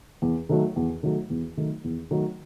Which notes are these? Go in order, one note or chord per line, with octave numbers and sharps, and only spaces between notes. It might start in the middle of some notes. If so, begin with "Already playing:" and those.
E2
D#3 F#3 A3
E2
D#3 F#3 A3
E2
D#3 F#3 A3
E2
D#3 F#3 A3